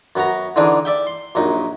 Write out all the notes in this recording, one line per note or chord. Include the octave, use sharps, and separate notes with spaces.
F#2 B3 F#4 A#5
D3 E3 C4 D4 D#4 G#4
D5 E5 G5
C6
A#1 F#2 D#4